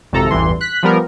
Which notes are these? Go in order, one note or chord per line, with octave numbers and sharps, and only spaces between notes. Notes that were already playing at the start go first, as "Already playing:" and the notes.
G#1 F2 C3 A4 A#5
A1 E2 G2 E3 C6
F#6 B6
F3 G3 B3 A#4